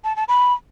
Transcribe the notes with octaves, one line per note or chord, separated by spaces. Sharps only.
A5
A5
B5